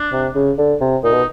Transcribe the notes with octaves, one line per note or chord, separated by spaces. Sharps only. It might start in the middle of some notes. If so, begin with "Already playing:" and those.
Already playing: D4
C3
C#3
D3
C3
A#2 D#4
B2